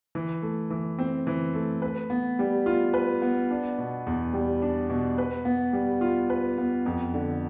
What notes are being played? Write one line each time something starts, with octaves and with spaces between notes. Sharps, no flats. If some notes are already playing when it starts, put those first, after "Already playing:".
E3
A3
E3
C4
E3
A3
B4
B3
G3
F4
B4
B3
D4
B2
E2
G3
D4
B2
B4
B3
G3
F4
B4
B3
F2
D3